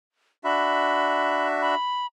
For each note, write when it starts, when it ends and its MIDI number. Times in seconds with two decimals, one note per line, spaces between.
0.44 1.75 62
0.44 1.75 66
0.44 1.75 76
0.44 1.47 83
1.62 2.06 83